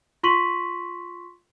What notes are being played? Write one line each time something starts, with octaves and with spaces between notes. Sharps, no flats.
F4 C6 C#6 B6 D#7 F#7